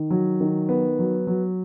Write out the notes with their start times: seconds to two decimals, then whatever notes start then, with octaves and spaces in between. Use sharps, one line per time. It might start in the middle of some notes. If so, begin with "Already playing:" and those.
Already playing: D#3
0.10 F#3
0.41 D#3
0.69 B3
0.99 F#3
1.27 F#3